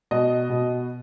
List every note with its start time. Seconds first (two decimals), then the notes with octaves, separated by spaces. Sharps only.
0.11 B2 D#5
0.50 B2